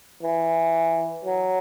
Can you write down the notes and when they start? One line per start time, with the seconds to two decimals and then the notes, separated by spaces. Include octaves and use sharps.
0.23 E3
1.25 F#3